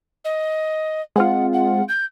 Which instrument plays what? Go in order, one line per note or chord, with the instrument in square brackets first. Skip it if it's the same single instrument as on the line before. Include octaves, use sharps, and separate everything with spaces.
[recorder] D#5
[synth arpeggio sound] G#3 C4 F4 [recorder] F#5
[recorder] F#5
G6